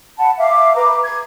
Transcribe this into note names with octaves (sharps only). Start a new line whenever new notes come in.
F#5 A5 B5
E5 F5 D6
B4 A#5 D6
G#6